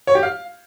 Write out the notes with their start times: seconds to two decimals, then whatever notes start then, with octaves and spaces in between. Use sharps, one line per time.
0.07 C#5
0.15 G4
0.23 F5